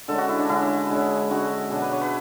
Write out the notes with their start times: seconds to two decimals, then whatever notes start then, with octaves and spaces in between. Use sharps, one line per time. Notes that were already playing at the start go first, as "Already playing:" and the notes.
0.08 D3 G#3 C#4 A4
0.18 F#4
0.29 E4
0.39 D4
0.49 D3 G#3 C#4 E4
0.90 D3 G#3 C#4
1.31 D3 G#3 C#4 F#4
1.71 B2 F#3 B3 D4 G#4
1.82 B4
1.92 C#5
2.01 B4